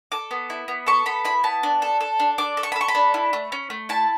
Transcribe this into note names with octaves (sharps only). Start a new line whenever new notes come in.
A4 D6
B3
E4
B3
A4 C#6
B3 B5
E4 B5
B3 A5
D4
A4
A4
D4
D4 D6
A4
C#6
B5
A4
C#6
B5
D4
E4
A3
C#4
A3
E4 A5